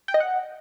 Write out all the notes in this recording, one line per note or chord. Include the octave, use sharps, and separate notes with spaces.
G5
D#5
F#5